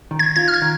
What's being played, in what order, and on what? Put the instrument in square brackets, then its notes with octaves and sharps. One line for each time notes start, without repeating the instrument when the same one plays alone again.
[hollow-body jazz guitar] D#3
[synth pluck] G#6
[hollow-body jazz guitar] F4 [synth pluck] G#6
[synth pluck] F6
G#6
[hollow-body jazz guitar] D#3